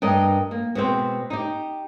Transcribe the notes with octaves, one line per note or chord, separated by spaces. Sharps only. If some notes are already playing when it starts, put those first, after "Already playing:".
G2 A#4 D#5
A#3
B2 G#3 C4
D#4 G4